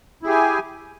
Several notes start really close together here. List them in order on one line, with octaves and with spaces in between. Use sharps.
E4 G#4 G4 G#5